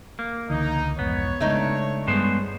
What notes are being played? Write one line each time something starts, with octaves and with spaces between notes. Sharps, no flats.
A#3
C#2 D3 E3 D#4
B1 F2 G#2 B3 C#5
C#3 G#3 A3 D4 D#4
G2 G3 G#3 B3 C5